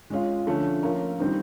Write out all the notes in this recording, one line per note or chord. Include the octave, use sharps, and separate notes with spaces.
G#3 C#4 F4
D3 F3 A3 C#4
F3 A#3 C#4 F4 A#4
D#3 G3 C4 D#4